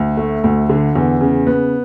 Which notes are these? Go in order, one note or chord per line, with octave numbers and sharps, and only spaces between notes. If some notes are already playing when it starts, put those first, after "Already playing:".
Already playing: D2
A3
D2
D3
E2
C#3
B3